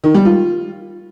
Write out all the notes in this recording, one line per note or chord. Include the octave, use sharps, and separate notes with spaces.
D#3
G3
F4